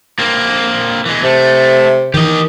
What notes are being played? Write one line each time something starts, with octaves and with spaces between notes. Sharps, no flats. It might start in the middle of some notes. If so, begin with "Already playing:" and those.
A#3 C4
E3 G#3
C3 A3
D#3 E3 G4 D#5